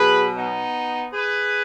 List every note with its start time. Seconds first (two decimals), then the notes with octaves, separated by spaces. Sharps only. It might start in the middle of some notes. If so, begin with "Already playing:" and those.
Already playing: B2 F#3 G#4 B4
0.35 B3 D#4
1.12 G#4 B4